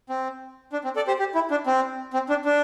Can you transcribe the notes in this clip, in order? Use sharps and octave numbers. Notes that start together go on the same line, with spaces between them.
C4
D4
C4
A4 D5
G4 C5
G4
E4
D4
C4
C4
D4
D4